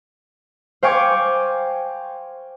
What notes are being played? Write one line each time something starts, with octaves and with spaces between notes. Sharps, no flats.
C5 F5 G5 G#5 C#6 D6